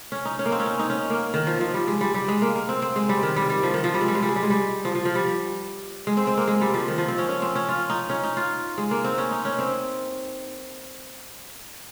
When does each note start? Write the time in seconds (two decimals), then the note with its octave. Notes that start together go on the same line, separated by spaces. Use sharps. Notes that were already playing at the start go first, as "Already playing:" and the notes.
0.12 C#4
0.25 D#4
0.39 C#4
0.46 A#3
0.52 C4
0.60 C#4
0.66 D#4
0.79 D#4
0.90 C#4
1.10 A#3
1.34 D#3
1.47 F3
1.61 F3
1.74 G3
1.88 G#3
2.01 G3
2.14 G3
2.28 G#3
2.42 A#3
2.55 A#3
2.69 C4
2.82 C4
2.96 G#3
3.09 G3
3.23 D#3
3.36 G3
3.50 G3
3.63 F3
3.74 D#3
3.84 F3
3.94 G3
4.01 G#3
4.08 G3
4.15 G#3
4.22 G3
4.29 G#3
4.36 G3
4.43 G#3
4.50 G3
4.85 F3
4.95 F3
5.05 F3
5.15 G3
6.07 G#3
6.17 C4
6.27 C4
6.37 A#3
6.48 G#3
6.61 G3
6.74 F3
6.88 D#3
6.98 F3
7.08 C4
7.18 C#4
7.29 C#4
7.42 C4
7.55 C#4
7.69 F4
7.90 D#4
8.10 C#4
8.23 D#4
8.37 F4
8.78 G#3
8.91 A#3
9.04 C4
9.18 C#4
9.31 D#4
9.45 C#4
9.58 C4